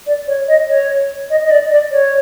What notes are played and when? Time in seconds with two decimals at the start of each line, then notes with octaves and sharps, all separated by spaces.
0.07 D5
0.27 C#5
0.48 D#5
0.68 C#5
1.30 D#5
1.44 D#5
1.51 D5
1.71 D5
1.91 C#5